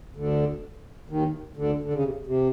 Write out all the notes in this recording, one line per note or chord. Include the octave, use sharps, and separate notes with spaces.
D2 D3
D#2 D#3
D2 D3
D3
C#3
C3
C3